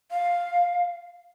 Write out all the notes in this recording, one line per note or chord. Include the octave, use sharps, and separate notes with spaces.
F5